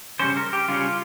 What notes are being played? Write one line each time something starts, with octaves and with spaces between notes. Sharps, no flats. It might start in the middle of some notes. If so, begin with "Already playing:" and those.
C#3 G3 C#4 C5
A#4
G4
C#3 G3 C#4 F4